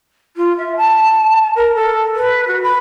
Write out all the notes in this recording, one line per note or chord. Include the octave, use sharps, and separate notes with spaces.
F4
E5
A5
A#4
A4
B4
F#4
B5